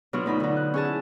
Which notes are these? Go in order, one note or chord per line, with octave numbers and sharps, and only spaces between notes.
B2 F#3 D4 F4 F#4
D2 D#4 B5
D3 D#4
F#6
C#4 G#4 A5
E4